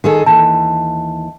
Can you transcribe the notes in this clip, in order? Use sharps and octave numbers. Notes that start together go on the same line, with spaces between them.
D#3 G#4 A4
D#2 E3 A5